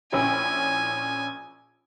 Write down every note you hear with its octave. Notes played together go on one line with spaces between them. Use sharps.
A#1 C#4 E4 G#5